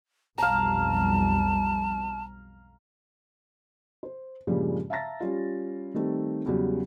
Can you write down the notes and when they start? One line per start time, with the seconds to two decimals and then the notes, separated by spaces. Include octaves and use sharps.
0.38 B1 F2 G3 F5 A5 A#5
4.03 C5
4.47 G2 A#2 C#3 F3 G3 G#3
4.90 E5 F5 A5 A#5 A6 A#6
5.20 G3 C#4 F4
5.94 D#3 G3 A3 C4
6.46 E2 C#3 F#3 G3